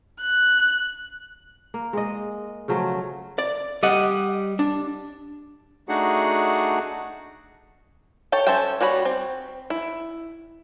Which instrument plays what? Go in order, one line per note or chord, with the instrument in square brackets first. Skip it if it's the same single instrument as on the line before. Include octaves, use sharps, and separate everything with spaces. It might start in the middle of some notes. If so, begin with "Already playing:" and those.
[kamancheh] F#6
[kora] A#3
G#3 D#5
C#3 F3 F#3 A3
[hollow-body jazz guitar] D5
G3 D#5 F#5
D4
[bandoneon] A3 D4 D#4 F#4 G#4 F#5
[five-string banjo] A4 C#5 G5 A5
C#4 A4 C5 E5 G5
G3 F#4 C#5 B5
C4
E4